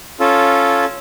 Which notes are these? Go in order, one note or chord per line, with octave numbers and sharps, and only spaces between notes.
C#4 F4 A4